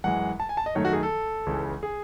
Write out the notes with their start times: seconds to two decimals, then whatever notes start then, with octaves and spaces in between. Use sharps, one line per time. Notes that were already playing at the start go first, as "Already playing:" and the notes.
0.04 F#2 E3 G#3 F#5
0.40 A5
0.49 G#5
0.57 A5
0.66 D#5
0.75 F#2 D#3 A3 C#5
0.85 F#4
0.93 G#4
1.03 A4
1.47 C#2 C#3 E3
1.83 G#4